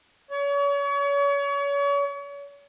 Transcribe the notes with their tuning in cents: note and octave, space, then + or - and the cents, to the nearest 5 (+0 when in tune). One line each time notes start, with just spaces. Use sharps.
C#5 +35